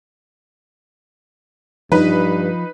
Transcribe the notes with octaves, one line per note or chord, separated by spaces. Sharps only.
G2 F3 D#4 B4